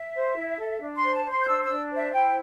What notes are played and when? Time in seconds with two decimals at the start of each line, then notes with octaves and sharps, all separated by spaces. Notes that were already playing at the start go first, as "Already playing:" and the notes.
Already playing: E5
0.14 C5
0.36 E4
0.58 A4
0.80 D4
0.97 C6
1.02 C5
1.13 A5
1.24 C5
1.30 C6
1.41 G6
1.46 D4 E6
1.63 E6
1.68 D4
1.90 C5
1.96 E5
2.12 E4 G5